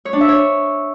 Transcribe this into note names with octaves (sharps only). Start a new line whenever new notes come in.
C#5
D4
E5
C#5